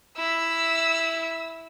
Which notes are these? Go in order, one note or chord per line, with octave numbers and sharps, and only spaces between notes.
E4 E6